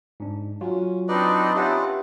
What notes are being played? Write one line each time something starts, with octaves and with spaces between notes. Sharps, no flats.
G#2 D4
F#3 C#4 F4 F#4
C4 D4 D#4 B4 D5 D#5
C#4 F4 G4 B4 E5 F#5